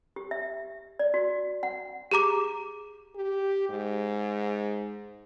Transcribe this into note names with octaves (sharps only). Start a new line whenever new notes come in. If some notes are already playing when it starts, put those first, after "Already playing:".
G4
E5
D5
F#4
F#5
G4 G#4 A#5 D6
G4
G#2